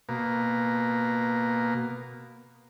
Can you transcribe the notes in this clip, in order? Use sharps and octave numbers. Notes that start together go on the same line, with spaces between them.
B2 A#3